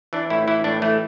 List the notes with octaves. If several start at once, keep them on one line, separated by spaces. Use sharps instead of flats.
E3 D4
A2 E4
E3 E4
A2 D4
E3 A3